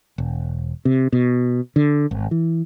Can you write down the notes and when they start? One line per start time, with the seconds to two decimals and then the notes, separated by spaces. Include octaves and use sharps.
0.18 E1
0.85 C3
1.13 B2
1.76 D3
2.11 G#1
2.31 E3